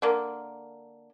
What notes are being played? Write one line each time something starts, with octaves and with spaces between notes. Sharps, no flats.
D3 A#3